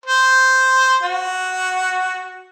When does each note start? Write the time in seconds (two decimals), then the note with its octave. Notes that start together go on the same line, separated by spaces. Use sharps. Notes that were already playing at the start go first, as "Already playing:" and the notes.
0.06 C5
1.03 F#4